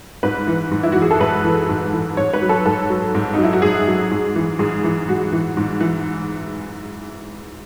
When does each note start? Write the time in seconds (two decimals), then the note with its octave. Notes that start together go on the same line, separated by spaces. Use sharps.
0.23 G#2 B4
0.47 E3
0.71 G#2
0.83 E4
0.92 F#4
0.96 E3
1.02 G#4
1.11 A4
1.19 G#2 B4
1.44 E3
1.69 G#2
1.93 E3
2.17 G#2 C#5
2.34 B4
2.42 F#3
2.49 A4
2.66 G#2 A4
2.90 F#3
3.15 G#2
3.34 F#3 D#4
3.43 E4
3.53 F#4
3.62 G#2 G#4
3.87 F#3
4.11 G#2
4.35 E3
4.59 G#2 G#4
4.84 E3
5.08 G#2 F#4
5.33 E3
5.57 G#2
5.80 E3